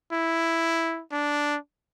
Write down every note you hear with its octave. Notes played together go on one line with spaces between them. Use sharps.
E4
D4